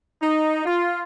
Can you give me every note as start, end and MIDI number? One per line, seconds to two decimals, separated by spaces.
0.22 0.63 63
0.66 1.02 65